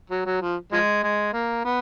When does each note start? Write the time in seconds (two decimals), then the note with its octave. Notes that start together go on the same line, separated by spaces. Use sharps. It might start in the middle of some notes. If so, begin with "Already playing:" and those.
0.10 F#3
0.26 F#3
0.42 F3
0.73 F3 G#3
1.03 G#3
1.33 A#3
1.65 B3